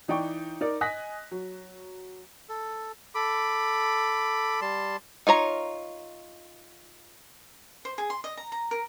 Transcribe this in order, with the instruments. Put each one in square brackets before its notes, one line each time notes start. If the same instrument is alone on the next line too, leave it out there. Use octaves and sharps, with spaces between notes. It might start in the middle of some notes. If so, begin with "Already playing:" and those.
[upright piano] E3 D#4 D5 G5 C#6
D#4 A#4 D5
D#5 G#5 D#6 F#6 A#6 B6
F#3
[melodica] A4
A4 B5 D6
G3 A5 C6
[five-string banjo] D#4 F4 C#5 A#5
[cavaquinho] C5
G#4
C6
D#5
A#5
A#5
A#4